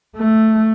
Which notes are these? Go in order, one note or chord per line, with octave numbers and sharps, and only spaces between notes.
A3